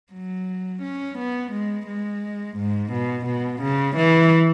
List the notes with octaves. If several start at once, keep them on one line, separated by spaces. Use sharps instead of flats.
F#3
C#4
B3
G#3
G#3
G#2
B2
B2
C#3
E3